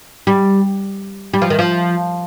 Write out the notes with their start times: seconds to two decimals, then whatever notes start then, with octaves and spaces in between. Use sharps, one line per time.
0.27 G3
1.34 G3
1.42 F3
1.50 D#3
1.59 F3